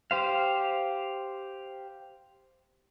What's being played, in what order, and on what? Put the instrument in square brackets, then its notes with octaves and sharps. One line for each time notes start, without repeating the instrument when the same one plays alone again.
[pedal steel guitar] G4 C5 F5